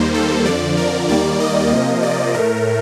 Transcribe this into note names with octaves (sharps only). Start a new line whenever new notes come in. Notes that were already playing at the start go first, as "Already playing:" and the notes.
Already playing: D#2 D#3 G3 A#3 C5
A4
F2 D3 F3 D5
A#4
D#2 D#3 G3 A#3 D5
D#5
C3 F3 A#3
D5
A2 A3 A#4